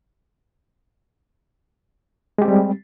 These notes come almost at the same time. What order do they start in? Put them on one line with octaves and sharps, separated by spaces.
G#3 G4 C4 G3